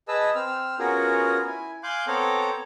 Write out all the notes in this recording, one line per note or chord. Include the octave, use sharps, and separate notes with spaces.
G#4 B4 D#5 A5 E6
C4 E6 F6
B3 C#4 F4 F#4 G#4 A#4
E4 G#5
F5 G#5 C6 D6 F#6 G6
B3 C4 A4 C#5 A#5 D6